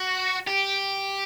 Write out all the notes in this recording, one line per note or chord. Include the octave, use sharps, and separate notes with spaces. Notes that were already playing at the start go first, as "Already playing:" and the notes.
Already playing: F#4
G4